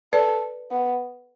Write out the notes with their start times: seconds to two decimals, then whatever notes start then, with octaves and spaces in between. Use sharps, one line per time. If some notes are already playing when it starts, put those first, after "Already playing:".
0.13 A4 B4 D5
0.71 B3